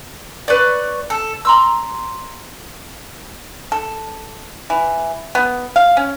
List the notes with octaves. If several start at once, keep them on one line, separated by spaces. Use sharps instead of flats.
B4 C#5 D5
A4
A#5 C6 E6
A4
E3
B3
F5
C#4